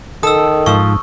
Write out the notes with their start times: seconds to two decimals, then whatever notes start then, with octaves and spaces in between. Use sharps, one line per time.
0.23 D#3 A4 D#6 E6
0.66 G#2 F3 C#6 E6